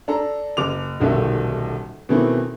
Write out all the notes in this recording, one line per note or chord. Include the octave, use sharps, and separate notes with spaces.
D4 A4 A#5
F#1 D6 F7
D#1 B1 D3 D#3 A3 E5
B2 D#3 E3 A3 C4